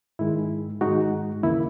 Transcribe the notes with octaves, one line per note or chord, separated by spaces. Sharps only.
G#2 D#3 G#3 E4
G#2 D#3 G#3 D#4 F#4
D#2 C#3 E3 A#3 E4